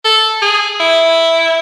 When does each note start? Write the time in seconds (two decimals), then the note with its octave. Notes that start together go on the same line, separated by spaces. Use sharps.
0.05 A4
0.42 G#4
0.80 E4